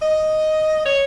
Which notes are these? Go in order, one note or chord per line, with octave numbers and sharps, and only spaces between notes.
D#5
C#5